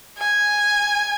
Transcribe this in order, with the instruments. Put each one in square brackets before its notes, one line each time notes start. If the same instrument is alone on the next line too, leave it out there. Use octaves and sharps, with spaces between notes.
[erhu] G#5